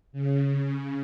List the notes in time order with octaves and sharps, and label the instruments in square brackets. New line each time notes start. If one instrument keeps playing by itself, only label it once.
[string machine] C#3